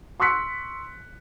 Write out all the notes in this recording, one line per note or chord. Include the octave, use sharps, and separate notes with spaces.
C6 C#6 E6 F#6 B6 C#7